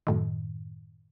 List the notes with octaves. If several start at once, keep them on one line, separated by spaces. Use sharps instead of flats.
F#2 A2 D#3